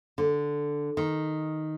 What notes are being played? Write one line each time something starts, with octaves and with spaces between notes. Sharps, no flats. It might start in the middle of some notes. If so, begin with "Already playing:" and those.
D3
D#3